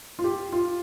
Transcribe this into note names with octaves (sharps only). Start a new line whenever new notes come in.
F4
G4
F4